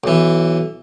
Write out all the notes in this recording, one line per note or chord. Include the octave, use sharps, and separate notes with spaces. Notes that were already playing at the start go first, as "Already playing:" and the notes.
B1 E3